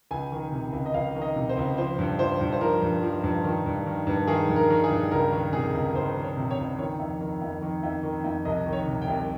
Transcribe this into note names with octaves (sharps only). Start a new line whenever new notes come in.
C#2 G#5
D#3
C3
C#2
D#5
C#2 F5
D#3
D#5
C3
C5
C#2
F3 C5
G2
F3 C5
G2
C5
F3 A#4
G2
F3
G2
D#3
G2
D#3
G2
D#3 G#4
G2
A#4
D#3
G#4
G2
C#2 A#4
D#3
C3 G#4
C#2
C#2 C5
D#3
C#5
C3
C#5
C#2
D#3 C#5
F2
D#3
F2
D#3
F2
D#3
F2
C2 D#5
D#3
C#5
C3
G5
C2